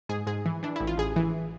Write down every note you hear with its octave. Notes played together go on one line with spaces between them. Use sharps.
G#2 G#4
G#2 G#4
E3
E3 D4
A1 E4
F4
A1 G#4
E3